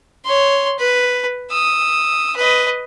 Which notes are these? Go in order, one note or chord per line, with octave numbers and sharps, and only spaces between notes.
C#5 C6
B4
D#6 E6
B4 D#5